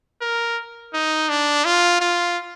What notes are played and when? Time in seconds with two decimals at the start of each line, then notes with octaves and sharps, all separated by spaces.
0.21 A#4
0.94 D#4
1.30 D4
1.65 F4
2.01 F4